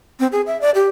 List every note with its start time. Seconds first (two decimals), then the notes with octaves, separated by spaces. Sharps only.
0.20 C4
0.32 G#4
0.47 E5
0.61 D5
0.75 G4